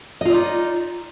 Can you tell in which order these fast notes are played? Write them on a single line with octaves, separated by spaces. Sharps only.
D#5 F4 D5 D#4